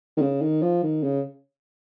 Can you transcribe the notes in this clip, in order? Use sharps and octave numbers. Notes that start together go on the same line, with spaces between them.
D#3
C#3
D#3
F3
D#3
C#3